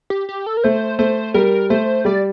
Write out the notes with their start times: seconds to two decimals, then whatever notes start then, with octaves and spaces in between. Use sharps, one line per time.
0.10 G4
0.29 G4
0.46 A4
0.57 A#4
0.64 A3 C5
0.99 A3 C5
1.34 G3 A#4
1.70 A3 C5
2.05 G3 D5